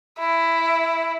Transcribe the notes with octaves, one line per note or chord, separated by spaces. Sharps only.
E4